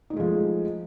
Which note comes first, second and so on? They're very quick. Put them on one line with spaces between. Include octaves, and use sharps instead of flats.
D#4 A3 G#3 F3